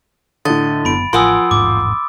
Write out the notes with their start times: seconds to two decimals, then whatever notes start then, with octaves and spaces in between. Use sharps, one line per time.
0.45 A2 D3 D#5 A6
0.85 F#1 B3 B5 D7
1.13 A1 F3 A#4 F#5 G#5 C6 D#6 E6
1.51 E1 A1 G#2 D6